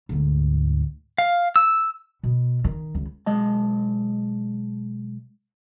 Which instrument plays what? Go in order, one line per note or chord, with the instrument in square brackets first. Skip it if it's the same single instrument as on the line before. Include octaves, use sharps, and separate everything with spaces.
[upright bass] D2 G#2
[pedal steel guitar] F5
E6
[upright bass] B2
D#3
C#2
[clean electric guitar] B1 G#3 D#5 A5